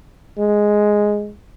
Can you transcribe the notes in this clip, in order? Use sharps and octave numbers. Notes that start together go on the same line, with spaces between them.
G#3